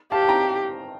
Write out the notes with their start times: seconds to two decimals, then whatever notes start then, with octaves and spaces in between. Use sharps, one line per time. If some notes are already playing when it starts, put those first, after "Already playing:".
0.12 G4 F5 A5
0.23 A5
0.29 G5 A#5